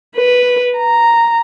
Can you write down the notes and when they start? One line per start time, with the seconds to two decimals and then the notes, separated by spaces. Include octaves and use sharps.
0.17 B4
0.78 A#5